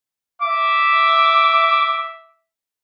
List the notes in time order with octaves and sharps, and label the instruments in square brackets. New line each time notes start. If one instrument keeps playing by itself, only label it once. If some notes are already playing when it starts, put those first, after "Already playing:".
[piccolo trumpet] E5 [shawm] D6